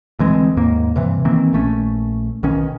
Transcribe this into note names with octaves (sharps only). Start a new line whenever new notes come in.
D2 E3 G#3 C4
D#2 G#2 A#3
G2 C3 E3
D#3 E3 A#3 C4
A#1 A3 C#4
B1 D#3 C#4